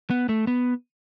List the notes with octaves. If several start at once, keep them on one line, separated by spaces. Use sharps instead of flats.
B3
A3
B3